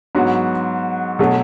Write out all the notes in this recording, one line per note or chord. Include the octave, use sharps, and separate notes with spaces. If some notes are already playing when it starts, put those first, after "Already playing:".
G#2 F#3 B3 F#4
B2 F#3 A3